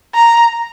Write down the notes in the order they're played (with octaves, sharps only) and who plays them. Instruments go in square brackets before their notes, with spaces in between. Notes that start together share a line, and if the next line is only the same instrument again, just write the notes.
[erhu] A#5